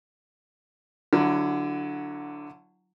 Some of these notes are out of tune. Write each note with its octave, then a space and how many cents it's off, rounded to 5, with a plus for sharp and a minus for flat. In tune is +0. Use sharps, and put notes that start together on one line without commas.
D3 +0 F#3 +0 E4 +35